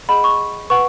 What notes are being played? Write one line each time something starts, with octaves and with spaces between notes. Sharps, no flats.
G#4 D#5 F#5 B5
C#6
B4 F#5 C#6